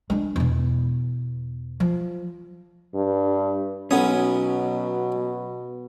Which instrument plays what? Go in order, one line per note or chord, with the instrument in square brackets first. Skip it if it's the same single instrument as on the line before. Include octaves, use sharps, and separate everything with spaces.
[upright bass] G#3 D4
E2 B2
F3
[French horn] G2
[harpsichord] B1 B3 D#6 [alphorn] B2 [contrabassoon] F#3 [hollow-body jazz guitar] C#4